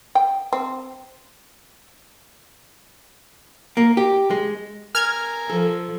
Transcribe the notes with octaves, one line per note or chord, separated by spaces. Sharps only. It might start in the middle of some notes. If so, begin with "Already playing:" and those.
G5
C4
A#3
G4
G#3
A#4 G#5 F6 G#6
F3 A4